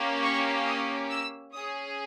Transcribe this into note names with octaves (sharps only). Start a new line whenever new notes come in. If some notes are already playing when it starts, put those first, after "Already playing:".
Already playing: A#3 C#4 G4
C#6
D#6
E6
C#4 G#4 D#6